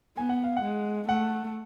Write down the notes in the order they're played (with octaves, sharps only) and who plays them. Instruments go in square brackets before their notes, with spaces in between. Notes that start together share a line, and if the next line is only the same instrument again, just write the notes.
[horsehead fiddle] B3 [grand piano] G#5
[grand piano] F#5
F5
F#5
[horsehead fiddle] G#3
[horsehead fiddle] A3 [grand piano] F#5